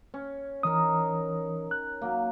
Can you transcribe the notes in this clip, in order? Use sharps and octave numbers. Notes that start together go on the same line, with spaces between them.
C#4
E3 D#4 A#4 D#6
F#6
F#3 A#3